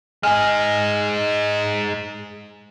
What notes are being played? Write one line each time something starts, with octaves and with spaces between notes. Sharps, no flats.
G#3 D#4 G#5 F6